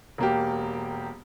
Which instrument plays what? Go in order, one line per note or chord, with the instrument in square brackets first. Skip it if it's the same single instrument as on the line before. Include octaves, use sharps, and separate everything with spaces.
[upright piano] E1 A#3 G4